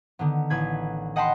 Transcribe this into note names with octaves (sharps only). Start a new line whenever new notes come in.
D3 D#3 B3
A1 B4 G#6
D#5 F#5 G5 A5 B5 C6